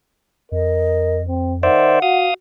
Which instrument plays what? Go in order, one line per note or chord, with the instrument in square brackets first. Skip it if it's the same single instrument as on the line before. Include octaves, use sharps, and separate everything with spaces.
[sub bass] F2 [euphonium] A#4 [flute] D#5
[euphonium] C4
[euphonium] D#3 [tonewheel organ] C5 D5 E5 [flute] F#5
[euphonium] F#4 [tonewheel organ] F5 D#6